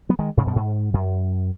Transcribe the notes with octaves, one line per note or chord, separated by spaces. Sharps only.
F#3 B3
D#3 G#3
G#2 C#3
F#2 B2
G#2
F#2